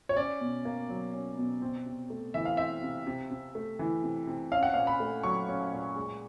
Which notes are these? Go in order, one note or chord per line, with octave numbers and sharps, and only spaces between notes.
C#5
C#4 D5
B2
A#3
F#3
C#4
B2
C4
C3
A3
E3 E5
F5
C4 E5
C3
C3
C3
A3
E3
C3
C3
C#4 F5
F#5
A#2 F5
B5
A3
F#3 C#6
C#4
A#2
G#3